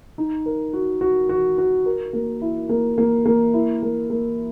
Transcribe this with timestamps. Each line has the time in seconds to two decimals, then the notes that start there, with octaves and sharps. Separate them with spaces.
0.18 D#4
0.46 A#4
0.73 F#4
1.01 F#4
1.29 F#4
1.58 F#4
1.86 A#4
2.13 A#3
2.42 E4
2.69 A#3
2.98 A#3
3.26 A#3
3.54 E4
3.82 A#3
4.10 A#3